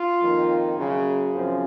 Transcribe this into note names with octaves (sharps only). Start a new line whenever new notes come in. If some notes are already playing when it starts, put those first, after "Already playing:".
Already playing: F4
F2 D#3 A#3
F#2 C#3 F#3 A#3 G#4
F#2 C#3 F3 C4